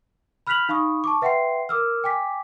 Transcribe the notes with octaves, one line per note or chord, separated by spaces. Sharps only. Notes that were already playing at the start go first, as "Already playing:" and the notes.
B5 F6 F#6 B6 F7 F#7
D#4 F5 B5 C#6 D#6
A5 C#6 D6
B4 E5 F#5 G5 C6 C7
A#4 D6 E6 F6
G5 G#5 D6 B6